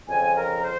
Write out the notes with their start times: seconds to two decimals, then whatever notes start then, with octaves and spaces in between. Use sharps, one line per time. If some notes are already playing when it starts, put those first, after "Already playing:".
0.08 F2 C#3 F3 C4 G#5
0.36 A#4
0.62 C5